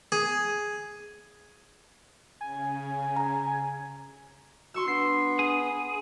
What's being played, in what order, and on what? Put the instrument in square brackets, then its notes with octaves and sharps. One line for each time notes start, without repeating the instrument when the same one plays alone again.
[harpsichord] G#4
[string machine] C#3 [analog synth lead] G#5
[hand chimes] A#5
[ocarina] F#4 [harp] C6 C#6 E6
[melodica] B3 [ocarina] D4 [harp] C7
[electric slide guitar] G#4